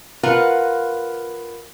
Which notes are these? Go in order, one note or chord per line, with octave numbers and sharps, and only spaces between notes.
F4 A#4 B4 F5 F#5